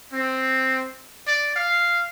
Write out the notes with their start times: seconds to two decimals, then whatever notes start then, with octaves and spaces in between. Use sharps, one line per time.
0.13 C4
1.27 D5
1.56 F5